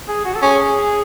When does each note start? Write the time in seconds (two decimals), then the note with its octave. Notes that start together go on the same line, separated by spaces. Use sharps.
0.08 G#4
0.25 F#4
0.35 A4
0.42 C#4 G#4